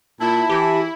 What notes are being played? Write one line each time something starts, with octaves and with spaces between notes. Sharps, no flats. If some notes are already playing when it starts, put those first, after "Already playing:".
A#2 E4 A5
E3 G4